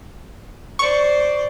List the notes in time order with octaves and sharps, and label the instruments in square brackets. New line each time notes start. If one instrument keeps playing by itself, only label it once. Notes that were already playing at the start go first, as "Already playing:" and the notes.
[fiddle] C5 D5 [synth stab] C#6